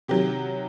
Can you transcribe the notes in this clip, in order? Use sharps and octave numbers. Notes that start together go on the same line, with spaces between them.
C3 D#3 F#3 G4